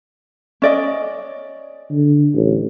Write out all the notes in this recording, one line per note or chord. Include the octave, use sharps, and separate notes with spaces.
C#4 D5 D#5
D3
A1